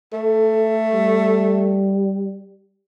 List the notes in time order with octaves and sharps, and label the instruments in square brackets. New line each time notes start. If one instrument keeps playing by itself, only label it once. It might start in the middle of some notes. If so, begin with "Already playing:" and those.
[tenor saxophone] A3 [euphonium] A4
[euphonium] G3